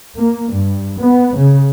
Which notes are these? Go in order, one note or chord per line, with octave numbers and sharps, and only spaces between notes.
A#3
G2
B3
C#3